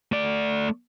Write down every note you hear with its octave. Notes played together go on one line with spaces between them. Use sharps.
A3 D5